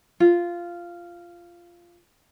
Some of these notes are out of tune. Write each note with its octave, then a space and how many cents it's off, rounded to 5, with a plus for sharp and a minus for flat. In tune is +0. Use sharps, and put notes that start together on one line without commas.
F4 -10